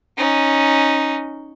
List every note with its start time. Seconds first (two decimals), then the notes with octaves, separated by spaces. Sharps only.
0.18 C#4 D#4